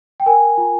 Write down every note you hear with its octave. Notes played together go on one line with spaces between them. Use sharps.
G5
A#4 G#5
F4